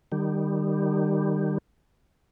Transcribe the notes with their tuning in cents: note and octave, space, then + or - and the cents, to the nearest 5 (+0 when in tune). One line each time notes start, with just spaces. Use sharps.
D#3 -30 G3 +0